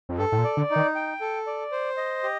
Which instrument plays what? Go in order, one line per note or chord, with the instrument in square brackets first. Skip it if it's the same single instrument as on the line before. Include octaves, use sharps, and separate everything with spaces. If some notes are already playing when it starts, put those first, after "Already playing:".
[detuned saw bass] F2
[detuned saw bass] G2 [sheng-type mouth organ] A4
[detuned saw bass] A2
A#2
[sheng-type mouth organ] D5
[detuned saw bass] D3
[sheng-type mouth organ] D#4
[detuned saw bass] D#3
[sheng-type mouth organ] G5
A4
D5
C5
D#5
G4